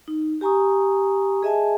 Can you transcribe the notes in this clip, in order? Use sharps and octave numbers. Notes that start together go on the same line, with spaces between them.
D#4
G4 G#5 A#5 C#6 D#6
G#4 D#5 E5 G#5 A5